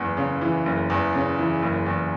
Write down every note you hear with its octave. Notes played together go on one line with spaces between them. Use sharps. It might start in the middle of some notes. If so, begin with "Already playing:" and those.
Already playing: F#1 E2
C#3
E3
F#1
E2
C#3
E3
F#1
E2